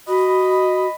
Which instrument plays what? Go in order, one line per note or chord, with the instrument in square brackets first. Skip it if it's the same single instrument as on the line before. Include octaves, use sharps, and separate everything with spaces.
[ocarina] F#4 [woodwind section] D#5 B5